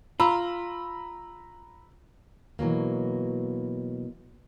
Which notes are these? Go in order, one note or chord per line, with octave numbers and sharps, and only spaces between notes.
F4 A#5 B5 E6
B2 E3 F#3 A#3